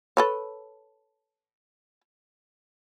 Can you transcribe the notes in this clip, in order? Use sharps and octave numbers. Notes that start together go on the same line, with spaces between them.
A4 B4 C#5